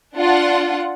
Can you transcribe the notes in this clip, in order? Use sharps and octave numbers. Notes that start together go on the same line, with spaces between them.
D4 F4 F#5